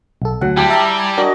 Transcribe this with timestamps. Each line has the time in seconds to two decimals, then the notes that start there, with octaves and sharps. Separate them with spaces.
0.22 B1 A4
0.41 D2 F#3 F#5
0.57 G3 E4 G4 A5
0.70 E5 A#5
0.97 G#5 A#5 G#6
1.18 D4 F#4 A#4 D5 D#5